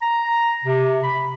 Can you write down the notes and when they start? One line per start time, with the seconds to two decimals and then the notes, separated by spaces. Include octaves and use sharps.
0.02 A#5
0.65 C3
1.02 B5